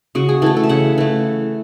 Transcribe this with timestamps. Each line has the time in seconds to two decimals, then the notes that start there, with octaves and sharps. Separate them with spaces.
0.15 C#3 F#4
0.29 G#4
0.42 E3 A3 A4
0.56 A4
0.63 E5
0.69 C#3 F#5
0.98 E3 A3